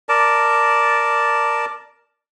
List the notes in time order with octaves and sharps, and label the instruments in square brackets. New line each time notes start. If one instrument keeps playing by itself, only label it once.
[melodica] A#4 D5 A5